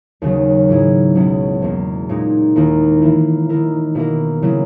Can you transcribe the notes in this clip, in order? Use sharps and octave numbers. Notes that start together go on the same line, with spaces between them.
D#2 C#3 F#3
G#2 F#3 A#3 E4 G#4
C#2 B2 F#3 C#4 E4
E2 B2 A#3
A#2 G#3 D#4
D#2 D#3 A#3 E4
E3 A#3 E4
D#3 A#3 E4 A#4
B2 A#3 E4 A#4
C#3 F#3 A#3 E4